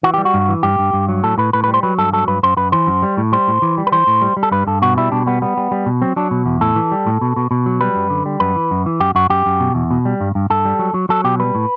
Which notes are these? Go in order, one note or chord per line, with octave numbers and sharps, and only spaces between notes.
E3 F#4
G3 G4
F#4
G2
E3
G2 G4
G2
G2
F#3
A2 A4
A2 B4
A2 B4
B4
G3
C5
F#3 B4
G2 A4
F#3 A4
G2 B4
F#2 C5
F#2 B4
E3 C5
F#2
G3
A2
G3 C5
A2
E3
G3
B4
E3 C5
A2
G3
G3
A4
G2 B4
G2 A4
B2 F#4
G3 E4
B2 D4
G3 B3
G3 B3
G3
G3
B2
F#3 C4
F#3 D4
B2
E2
A2 A4
E3
G3
A2
B2
B2
B2
F#3
G3 B4
F#2
D3
G3
F#2 B4
E3
F#2
E3
F#2 G4
F#2 F#4
F#2 G4
F#2
B2
E2
B2
G3
G2
G2
G2 A4
G3
F#3
F#3
F#3 A4
B2 G4
G3 B4
A2